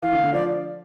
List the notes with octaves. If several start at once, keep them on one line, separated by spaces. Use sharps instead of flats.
E3 F5
D3
D3
F3 D5